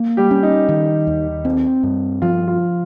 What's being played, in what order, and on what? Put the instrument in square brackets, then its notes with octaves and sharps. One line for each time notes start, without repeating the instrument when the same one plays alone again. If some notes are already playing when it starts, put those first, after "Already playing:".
Already playing: [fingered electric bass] A#3
[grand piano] G3 G4
[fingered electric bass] C#4
[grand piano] D#4
[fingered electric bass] D#3
D#2
C4
G2
[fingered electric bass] F3 [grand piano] F4
[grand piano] F4